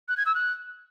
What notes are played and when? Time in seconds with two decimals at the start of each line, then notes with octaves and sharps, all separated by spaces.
0.08 F#6
0.17 G#6
0.26 E6
0.35 F#6